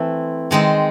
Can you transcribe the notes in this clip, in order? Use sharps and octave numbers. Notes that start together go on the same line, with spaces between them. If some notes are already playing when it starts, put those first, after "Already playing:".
Already playing: E3 A3 C4
D#3 G#3 C4 D#4